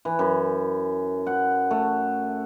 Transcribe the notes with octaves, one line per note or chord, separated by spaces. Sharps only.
E3
F#2
F#5
A3